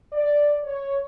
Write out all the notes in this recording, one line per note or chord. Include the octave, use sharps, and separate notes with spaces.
D5
C#5